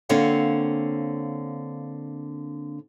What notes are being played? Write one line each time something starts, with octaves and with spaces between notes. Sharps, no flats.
D3 A#3 C4 C#5 F5 F#5